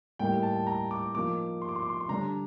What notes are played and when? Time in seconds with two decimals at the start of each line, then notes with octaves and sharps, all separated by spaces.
0.19 A2 G3 A#3 D#4 G5
0.43 A5
0.67 A#5
0.91 D6
1.14 F3 A#3 D#4 D6
1.62 C6
1.69 D6
1.76 C6
1.83 D6
1.90 C6
2.01 C6
2.08 D3 G3 D4 A#5